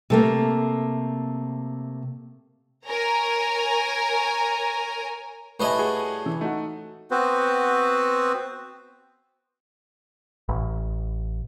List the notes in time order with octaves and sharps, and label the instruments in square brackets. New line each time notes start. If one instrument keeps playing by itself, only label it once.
[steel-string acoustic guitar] C3 A3 A#3
[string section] A#4 C#5 G#5 A#5
[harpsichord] A2 G3 D#5 [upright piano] B4 G#5
[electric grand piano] F#4 G#4
[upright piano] E3
[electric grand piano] A3 [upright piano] D#4 F#4
[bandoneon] B3 C4 F#4 B4 C5
[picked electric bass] A1